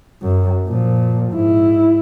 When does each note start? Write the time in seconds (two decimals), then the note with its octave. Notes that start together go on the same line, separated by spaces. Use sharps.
0.22 F#2
0.67 A#2 F3
1.33 G#2 E4